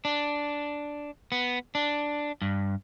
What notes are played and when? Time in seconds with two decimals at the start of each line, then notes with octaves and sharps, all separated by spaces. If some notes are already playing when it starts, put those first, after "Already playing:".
0.05 D4
1.32 B3
1.75 D4
2.42 G2